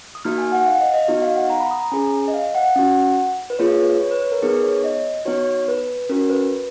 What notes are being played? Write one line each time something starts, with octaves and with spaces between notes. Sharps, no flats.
D#6
A#3 D#4 F#4 F6
G#5
F#5
F5
D#5
D#5
B3 D#4 F#4 D#5
F5
F#5
A#5
B5
D#6
A#5
C#4 G#4 G#5
D#5
F5
F#5
C#4 F#4
B4
A#3 F4 G#4 C#5
B4
C#5
B4
B4
A#4
B3 D#4 G#4 B4
C#5
D#5
B3 D#4 F#4 C#5
B4
C#4 F#4 A#4
B4